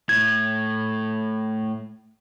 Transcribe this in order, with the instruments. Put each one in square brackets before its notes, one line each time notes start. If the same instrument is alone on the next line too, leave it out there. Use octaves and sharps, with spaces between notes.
[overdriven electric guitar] A2 [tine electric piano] G#6